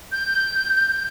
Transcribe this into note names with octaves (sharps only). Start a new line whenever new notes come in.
G6